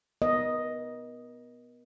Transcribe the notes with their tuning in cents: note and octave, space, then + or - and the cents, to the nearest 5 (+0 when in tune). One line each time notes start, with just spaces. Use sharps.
B3 +0 A#4 +35 D#5 +0